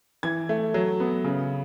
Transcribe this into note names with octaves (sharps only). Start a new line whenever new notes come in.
E3 G#6
A3
F#3
B3
C#3